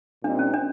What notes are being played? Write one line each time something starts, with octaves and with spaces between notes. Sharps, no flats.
A#2 G3 C4 D4 D#4
C#4
D4